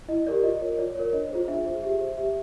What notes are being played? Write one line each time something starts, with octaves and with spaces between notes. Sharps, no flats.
E4 D#5
G4 A#4 D5
F4 D#5
A#4 C#5
F4 D5
A#4 C#5
D4 D#5
F4 G#4 C5
D4 E5
F4 G#4 C5
G4 E5
C5
G4 E5